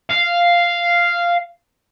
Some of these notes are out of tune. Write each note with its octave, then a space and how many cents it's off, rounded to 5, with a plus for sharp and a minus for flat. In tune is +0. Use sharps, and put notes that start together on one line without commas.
F5 -5